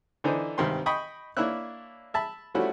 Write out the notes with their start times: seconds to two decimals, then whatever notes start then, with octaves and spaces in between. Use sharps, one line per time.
0.24 D3 E3 D4 D#4 C5
0.58 G#1 G2 C3 D#3 C4 C6
0.86 D#5 G5 B5 C#6 D#6
1.37 A#3 D4 E4 C#5 E5 F#6
2.14 E5 A5 B5
2.54 F3 G3 A3 C#4 E4 F#4